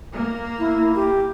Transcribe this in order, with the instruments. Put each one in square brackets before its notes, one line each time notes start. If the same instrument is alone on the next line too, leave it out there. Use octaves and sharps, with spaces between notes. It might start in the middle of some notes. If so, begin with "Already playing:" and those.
[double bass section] A#3
[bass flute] E4
G4